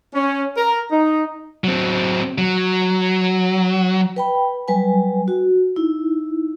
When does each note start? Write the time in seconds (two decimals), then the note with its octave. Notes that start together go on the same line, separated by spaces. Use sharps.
0.14 C#4
0.57 A#4
0.91 D#4
1.64 F#3 C4
2.38 F#3
4.16 B4 G5 B5
4.68 F#3 G3 B4 G#5
5.28 F#4
5.76 D#4 E4